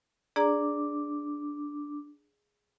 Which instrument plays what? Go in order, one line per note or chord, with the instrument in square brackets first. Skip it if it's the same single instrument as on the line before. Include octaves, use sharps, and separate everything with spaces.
[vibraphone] D4 D6 [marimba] G#4 D5 A#5